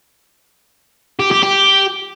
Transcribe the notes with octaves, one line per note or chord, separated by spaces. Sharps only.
G4
G4
G4